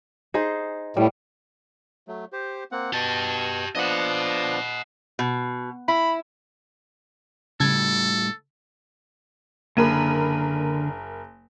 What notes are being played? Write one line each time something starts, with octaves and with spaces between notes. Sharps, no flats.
D#4 G#4 C5
A2 G3
F#3 A3
G4 C5
A#3 C4 F#5
B2 G4 A5
F3 B3 D4 D#5 F#5
B2
E4 B5
A2 C#3 G3 A4 G#6
F#1 D3 A#3 A#4 B5 D#7